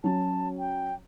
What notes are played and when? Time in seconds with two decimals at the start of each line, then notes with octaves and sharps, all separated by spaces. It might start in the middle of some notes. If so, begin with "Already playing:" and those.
0.04 F#3 C#4 A5
0.59 G5